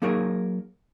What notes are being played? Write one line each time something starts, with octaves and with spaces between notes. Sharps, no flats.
F#3 A#3 D#4 G#4 A#4 C#5